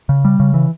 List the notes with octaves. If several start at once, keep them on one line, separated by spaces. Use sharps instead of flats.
C#3
G3
C#3
E3